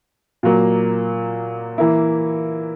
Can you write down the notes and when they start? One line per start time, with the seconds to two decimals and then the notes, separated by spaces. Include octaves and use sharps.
0.43 A#2 F#3 A#3
1.78 E3 A#3 E4